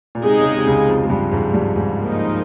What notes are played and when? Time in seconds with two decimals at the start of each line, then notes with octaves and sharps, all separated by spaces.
0.15 A#2
0.23 C3 G#3 D#4 G#4
0.40 C#3
0.45 C3
0.57 C3
0.67 C#2 C#3
0.88 F2 F3
1.04 G#3
1.10 G2 G3
1.32 G#2 G#3
1.54 G2 G3
1.76 G#2 G#3
1.98 F3 A#3 D#4 A#4